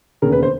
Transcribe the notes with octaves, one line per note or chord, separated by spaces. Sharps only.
E1 D#2 C#3 A#4
B4
C5